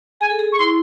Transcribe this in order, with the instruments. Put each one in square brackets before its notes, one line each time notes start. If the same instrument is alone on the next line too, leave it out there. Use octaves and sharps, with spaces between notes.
[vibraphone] G#4 [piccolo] G#5
[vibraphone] A4
G#4
[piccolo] C#6
[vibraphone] E4 [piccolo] C6